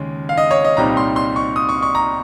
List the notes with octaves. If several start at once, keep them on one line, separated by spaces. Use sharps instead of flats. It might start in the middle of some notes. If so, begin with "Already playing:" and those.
Already playing: D#2 C#3 G#3 C#4
F5
D#5
C#5
D#5
C2 A#2 G3 C4 D#4 A#5
C6
C6
C#6
D#6
C#6
C#6
A#5